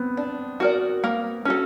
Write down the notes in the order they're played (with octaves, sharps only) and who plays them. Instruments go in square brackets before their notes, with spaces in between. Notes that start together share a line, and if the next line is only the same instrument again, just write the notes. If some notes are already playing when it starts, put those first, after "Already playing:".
Already playing: [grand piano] B3 C4
[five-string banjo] D4
F#4 A#4 D5
A#3
C#4 F#4 A4